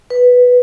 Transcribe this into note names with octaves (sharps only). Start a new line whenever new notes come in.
B4